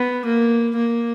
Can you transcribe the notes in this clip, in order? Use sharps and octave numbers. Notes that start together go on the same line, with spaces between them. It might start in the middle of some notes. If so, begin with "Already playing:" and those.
Already playing: B3
A#3
A#3